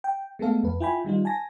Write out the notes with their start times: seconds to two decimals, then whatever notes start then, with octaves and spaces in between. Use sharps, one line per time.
0.04 G5
0.39 G#3 A3 B3 A4 F5
0.63 F2 B4
0.80 E4 F4 G5 G#5 B5
1.05 D#3 G3 D#4 F4
1.25 G#5 A5 A#6